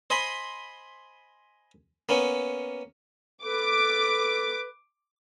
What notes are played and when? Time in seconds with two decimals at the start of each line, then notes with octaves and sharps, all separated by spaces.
0.10 C5 D#5 G#5 B5 C6
2.09 A#3 B3 C#4
3.44 A4 B4 D6